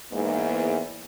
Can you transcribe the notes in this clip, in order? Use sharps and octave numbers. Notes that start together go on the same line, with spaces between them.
E2 G#2 A#3